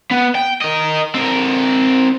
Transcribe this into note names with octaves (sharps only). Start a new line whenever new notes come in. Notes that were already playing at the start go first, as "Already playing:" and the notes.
B3
G5
A#4 D#5
C4 A#4